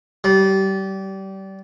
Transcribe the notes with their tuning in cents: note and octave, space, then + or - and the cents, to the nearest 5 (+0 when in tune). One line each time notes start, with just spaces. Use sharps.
G3 -25